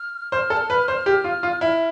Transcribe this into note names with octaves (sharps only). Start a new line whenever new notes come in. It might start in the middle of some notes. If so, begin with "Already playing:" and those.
Already playing: F6
C5 F6
A4
B4
C5
G4
F4
F4
E4